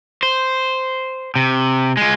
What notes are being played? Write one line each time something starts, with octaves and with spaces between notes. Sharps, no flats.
C5
C3
G#3 F4